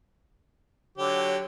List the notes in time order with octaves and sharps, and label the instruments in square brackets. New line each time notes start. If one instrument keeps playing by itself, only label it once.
[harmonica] D3 F#3 G4 [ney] C#5